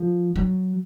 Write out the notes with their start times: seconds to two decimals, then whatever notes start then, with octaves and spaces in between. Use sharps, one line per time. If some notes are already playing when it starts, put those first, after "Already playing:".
Already playing: F3
0.36 F#3